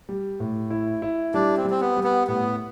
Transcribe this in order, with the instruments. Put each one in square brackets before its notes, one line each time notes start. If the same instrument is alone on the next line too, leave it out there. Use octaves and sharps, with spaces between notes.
[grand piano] G3
A2
E4
E4
[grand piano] G3 [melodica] D4
[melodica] C4
[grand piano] G3
[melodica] C4
B3
[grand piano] G3
[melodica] B3
[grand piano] A2 [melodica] B3